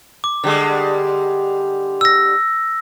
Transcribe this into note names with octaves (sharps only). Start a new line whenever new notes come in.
D6
D3 G3 G#3
E6 A#6